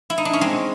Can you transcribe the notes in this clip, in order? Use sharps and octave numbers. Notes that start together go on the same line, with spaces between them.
E4
D#4
D4
C#4
G#3 C4